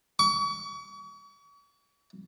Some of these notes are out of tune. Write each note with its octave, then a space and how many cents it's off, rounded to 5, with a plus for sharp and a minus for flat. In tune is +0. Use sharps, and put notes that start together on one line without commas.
C#6 +40